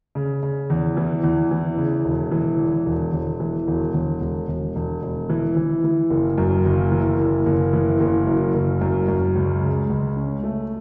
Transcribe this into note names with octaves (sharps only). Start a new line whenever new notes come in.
C#3
C#3
E2
E3
E2
E3
C#3
E1
E3
E2
E1
E1
E3
E1
E1
E1
E1
E1
E1
E3
E3
E3
F#1
F#2
F#1
E3
F#1
F#1
E3
F#1
F#2
F#1
F#2
F#2
C#2
C#3
C#2
C#4
A3